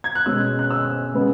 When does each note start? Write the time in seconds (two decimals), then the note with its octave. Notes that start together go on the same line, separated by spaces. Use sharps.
0.04 G#6
0.15 F#6
0.26 B2 G#3 C#4 E6
0.59 F#6
0.70 E6
1.14 C#3 G#3 B3